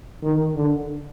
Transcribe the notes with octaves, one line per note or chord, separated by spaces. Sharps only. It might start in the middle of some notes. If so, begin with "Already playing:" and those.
D#3
D3